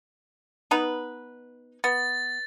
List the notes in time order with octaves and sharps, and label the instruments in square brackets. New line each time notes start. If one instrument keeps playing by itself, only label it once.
[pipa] B3 D#4 B4
[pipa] B3 [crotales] A6